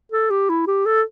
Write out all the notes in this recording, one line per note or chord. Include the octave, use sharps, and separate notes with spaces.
A4
G4
E4
G4
A4